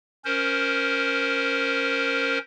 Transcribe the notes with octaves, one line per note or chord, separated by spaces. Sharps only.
C#4 A#4 C5